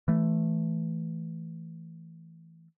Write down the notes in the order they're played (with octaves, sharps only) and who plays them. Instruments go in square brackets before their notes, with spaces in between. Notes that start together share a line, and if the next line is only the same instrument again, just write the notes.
[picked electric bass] E3 A3